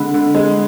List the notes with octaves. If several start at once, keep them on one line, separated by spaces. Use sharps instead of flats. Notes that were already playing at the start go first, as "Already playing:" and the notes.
Already playing: D3 G#3 B5
D3
G#3